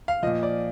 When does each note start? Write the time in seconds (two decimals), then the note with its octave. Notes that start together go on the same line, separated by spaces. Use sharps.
0.08 F5
0.23 A#2 F3 D#5
0.43 D5